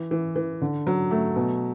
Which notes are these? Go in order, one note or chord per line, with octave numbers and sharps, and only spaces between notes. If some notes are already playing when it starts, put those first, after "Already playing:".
Already playing: E3
E3
E3
D3
F#3
A3
B2